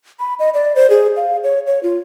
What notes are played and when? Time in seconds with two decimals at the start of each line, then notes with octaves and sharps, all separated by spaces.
0.20 B5
0.39 D#5
0.54 D5
0.76 C5
0.90 G#4
1.17 F5
1.44 C#5
1.67 C#5
1.83 F4